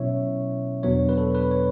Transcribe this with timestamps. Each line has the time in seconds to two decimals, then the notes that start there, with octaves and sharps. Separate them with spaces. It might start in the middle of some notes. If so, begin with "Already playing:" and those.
Already playing: B2 F#3 C#4 E4 C#5 E5
0.83 E2 B2 F#3 B3 D4 C#5
1.09 B4
1.18 A4
1.35 B4
1.51 C#5